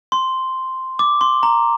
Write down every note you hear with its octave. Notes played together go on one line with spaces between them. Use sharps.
C6
D6
C6
A#5